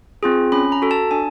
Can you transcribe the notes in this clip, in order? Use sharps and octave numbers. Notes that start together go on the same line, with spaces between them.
C4 F4 G#4
C#4 B5
A#5
F#4 A4
A5
D4 G#5